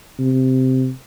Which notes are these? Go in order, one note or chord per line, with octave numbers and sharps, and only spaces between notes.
C3